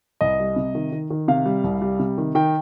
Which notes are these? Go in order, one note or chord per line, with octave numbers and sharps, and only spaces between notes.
C2 D#5
G3
C3
D#3
D#3
D#3
C3 F5
G3
C2
G3
C3
D#3
D#3 G5